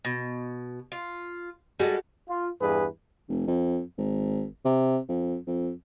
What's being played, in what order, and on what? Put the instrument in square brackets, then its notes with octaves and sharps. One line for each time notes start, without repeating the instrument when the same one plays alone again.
[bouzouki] B2
F4
[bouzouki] G3 G#3 A4 [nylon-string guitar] F#4 G#4
[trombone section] F4
E2 G2 G#4 B4
[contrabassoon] F1
F2
G#1
C3
F2
F2